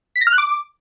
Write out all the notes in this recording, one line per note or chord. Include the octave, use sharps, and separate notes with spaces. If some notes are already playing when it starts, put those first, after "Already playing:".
B6
A#6
F6
F#6
D6